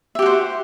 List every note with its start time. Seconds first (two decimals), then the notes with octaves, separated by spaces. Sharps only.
0.15 E5
0.19 G4
0.22 F#4
0.26 C5